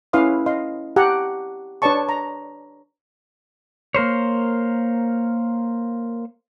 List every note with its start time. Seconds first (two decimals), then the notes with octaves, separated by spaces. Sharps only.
0.13 C#4 E4 B4 F5 C6 D#6
0.46 D#5 F5 C6
0.96 G4 F#5 A5 A#5
1.82 D4 B4 C#5 D5 A5 C#6
2.09 A#5
3.95 A#3 A#4 C5 C#5